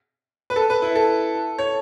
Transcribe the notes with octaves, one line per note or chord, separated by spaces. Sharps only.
B4
A4
B4
E4
A4
C#5